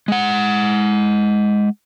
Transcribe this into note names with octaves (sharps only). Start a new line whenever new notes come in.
G#3 F#5